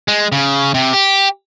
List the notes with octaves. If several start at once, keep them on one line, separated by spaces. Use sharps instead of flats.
G#3
C#3
C3
G4